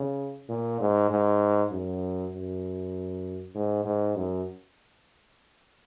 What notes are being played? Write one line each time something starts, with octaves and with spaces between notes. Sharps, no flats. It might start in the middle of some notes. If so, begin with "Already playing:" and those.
Already playing: C#3
A#2
G#2
G#2
F#2
F#2
G#2
G#2
F#2